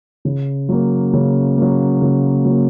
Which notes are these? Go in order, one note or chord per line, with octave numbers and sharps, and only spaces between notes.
C#3
F#3 A#3
C#3
A#3
F#3
C#3
F#3 A#3